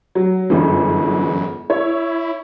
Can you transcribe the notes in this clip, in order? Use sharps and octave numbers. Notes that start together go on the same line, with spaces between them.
F#3
G1 C#2 F#2 E3
E4 C#5